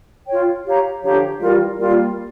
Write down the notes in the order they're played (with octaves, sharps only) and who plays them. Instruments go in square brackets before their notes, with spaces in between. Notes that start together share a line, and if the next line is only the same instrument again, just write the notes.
[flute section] F4 C#5 G5
G4 C#5 F5 A#5
[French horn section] D3 F3 [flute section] G4 C#5 F5 A#5
[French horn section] E3 G3 [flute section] F4 A#4 D5
[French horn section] G3 A#3 [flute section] F4 A#4 D5